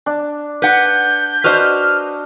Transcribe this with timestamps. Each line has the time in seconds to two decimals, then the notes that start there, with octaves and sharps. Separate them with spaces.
0.06 D4
0.62 B4 F#5 G6
1.44 D4 F#4 B4 C5 D#5 F6